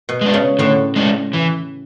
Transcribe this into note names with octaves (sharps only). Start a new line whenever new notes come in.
B2
G#3 D4
C#3
A2 D3
G#3 D4
E3